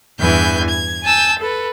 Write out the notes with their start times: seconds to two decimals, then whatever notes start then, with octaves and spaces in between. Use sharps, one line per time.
0.20 E2 G2 E3 G#5 G6
0.69 G#6
1.04 G#5 A5 E6 G6
1.38 A4 B4